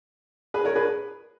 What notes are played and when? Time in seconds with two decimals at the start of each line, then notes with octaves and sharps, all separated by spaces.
0.54 G#4 B4
0.65 A#4 C#5
0.75 G#4 B4